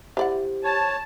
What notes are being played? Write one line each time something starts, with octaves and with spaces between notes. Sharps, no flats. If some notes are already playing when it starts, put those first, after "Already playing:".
E4 G4 C5 D5 F#5
C#5 A5